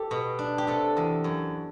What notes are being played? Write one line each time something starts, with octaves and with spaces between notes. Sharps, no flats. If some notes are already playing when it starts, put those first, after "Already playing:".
Already playing: G4 A4
B2
D4
G4
C3 A4
E2
F#2